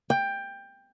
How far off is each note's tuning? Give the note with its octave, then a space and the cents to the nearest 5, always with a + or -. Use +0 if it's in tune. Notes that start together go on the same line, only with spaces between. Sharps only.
G5 +15